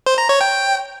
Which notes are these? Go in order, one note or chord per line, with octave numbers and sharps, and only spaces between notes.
C5
A#5
C#5
G5